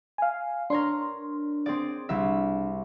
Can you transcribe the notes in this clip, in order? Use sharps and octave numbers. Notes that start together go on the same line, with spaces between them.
F5 G#5
D4 A#4 C#5 C6
C4 G#4 D5
C2 E5